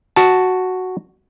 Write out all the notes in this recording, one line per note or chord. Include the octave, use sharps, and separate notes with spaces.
F#4 A5